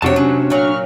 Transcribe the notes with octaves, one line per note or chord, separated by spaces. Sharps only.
F2 C3 F#3 D4 F#4 C#5 A5
C3 F#3 C#4
A#2 F#3 C#6 F6